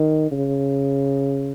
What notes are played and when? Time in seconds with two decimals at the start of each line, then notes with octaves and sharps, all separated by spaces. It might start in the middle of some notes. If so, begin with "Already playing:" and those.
Already playing: D#3
0.32 C#3